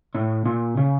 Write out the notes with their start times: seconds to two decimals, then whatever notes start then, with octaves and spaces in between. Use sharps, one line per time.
0.15 A2
0.45 A#2
0.77 C#3